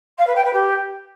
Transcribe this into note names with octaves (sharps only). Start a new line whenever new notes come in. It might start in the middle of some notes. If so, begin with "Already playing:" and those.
F5
B4
G5
B4
G4